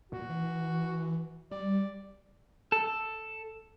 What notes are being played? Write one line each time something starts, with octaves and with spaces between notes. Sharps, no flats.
A#2 F#4
E3
G3 D5
A4